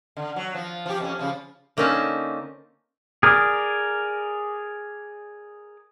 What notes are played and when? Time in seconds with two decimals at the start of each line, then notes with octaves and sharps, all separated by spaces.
0.17 D3
0.36 F#3
0.55 F3
0.86 F3 G4
1.00 F2 C#4
1.19 C#3 F3
1.77 D3 A#3 C4 C#4 D#4 A5
3.23 G#4 A#4 D5